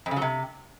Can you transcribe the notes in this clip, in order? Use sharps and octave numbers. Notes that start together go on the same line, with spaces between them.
F2
C#3
F#3
C3